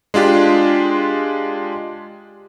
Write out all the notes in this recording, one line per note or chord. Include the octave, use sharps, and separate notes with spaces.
G#3 D4 F4 G4